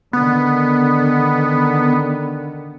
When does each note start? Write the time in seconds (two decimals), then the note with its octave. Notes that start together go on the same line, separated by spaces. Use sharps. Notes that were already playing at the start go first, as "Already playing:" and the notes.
0.13 D3 D#3 B3